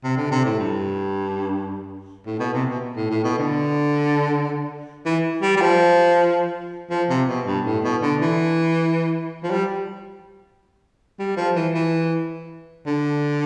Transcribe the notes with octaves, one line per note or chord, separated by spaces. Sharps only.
C3
D3
C3
A2
G2
A2
B2
C3
B2
A2
A2
B2
D3
E3
G3
G3
F3
F3
C3
B2
G2
A2
B2
D3
E3
F3
G3
G3
F3
E3
E3
D3